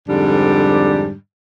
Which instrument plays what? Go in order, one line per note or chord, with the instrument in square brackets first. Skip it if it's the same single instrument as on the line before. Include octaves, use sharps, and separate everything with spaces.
[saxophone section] F2 G#2 D3 G3 D4